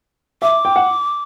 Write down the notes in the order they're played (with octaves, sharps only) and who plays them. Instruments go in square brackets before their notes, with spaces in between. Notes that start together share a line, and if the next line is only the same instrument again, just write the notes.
[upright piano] E5 [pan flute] D6
[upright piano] G5
F#5